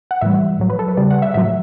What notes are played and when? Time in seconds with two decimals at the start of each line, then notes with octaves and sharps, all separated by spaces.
0.11 F#5
0.21 A2 E3 G3 E5
0.60 A2 F#3
0.70 B4
0.79 A4
0.88 B4
0.97 C#3 G3 D5
1.10 F#5
1.22 E5
1.34 A2 F#3 E5